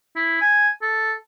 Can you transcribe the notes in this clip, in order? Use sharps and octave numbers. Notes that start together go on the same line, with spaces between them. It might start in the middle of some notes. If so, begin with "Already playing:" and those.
E4
G#5
A4